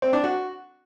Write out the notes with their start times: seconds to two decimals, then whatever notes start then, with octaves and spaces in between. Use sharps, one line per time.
0.02 C4
0.13 D4
0.24 F#4